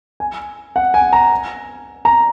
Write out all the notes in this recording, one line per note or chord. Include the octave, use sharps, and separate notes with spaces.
G#5
F#5
G#5
A#5
A#5